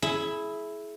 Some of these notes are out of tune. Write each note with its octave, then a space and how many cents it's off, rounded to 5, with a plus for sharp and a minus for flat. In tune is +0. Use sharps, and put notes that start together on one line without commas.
E4 +0 G#4 +30